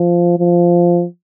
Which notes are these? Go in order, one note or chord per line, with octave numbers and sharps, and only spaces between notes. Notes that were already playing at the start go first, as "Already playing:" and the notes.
Already playing: F3
F3